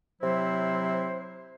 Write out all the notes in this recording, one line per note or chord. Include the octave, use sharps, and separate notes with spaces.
C3 F#3 E4 C5